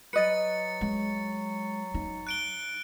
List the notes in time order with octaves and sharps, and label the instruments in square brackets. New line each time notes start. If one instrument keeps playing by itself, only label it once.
[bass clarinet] F#3 [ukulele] B4 D#5 [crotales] A6 C#7
[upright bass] G#3
D#4
[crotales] F#6 D7 G7